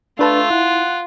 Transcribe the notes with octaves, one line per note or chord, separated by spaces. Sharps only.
A3 D4 F4 B4 A5
E4 F#5